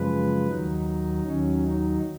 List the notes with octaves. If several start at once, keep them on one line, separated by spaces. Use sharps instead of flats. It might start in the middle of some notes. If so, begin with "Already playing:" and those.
Already playing: F#2 C#3 F3 G#3 B4
D#2 D#3 F#3 D#4
D#2 D#3 F#3 C#4
D#4